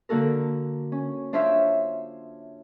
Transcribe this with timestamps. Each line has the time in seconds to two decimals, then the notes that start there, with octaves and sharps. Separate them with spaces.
0.09 D3 A#3 F#4 A4 A#4
0.92 C#4
1.33 D4 F4 C5 C#5 E5